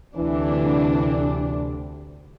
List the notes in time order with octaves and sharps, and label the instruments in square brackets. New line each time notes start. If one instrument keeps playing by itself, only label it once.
[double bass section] D2 C3 [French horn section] E3 [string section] D4